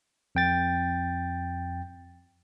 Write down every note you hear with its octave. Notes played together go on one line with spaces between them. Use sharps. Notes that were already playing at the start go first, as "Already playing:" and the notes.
F2 G5 A6